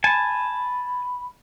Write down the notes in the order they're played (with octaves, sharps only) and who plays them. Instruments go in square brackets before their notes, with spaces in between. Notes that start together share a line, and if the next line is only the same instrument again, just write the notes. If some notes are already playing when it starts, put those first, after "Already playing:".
[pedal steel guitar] G#5 A5 [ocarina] B5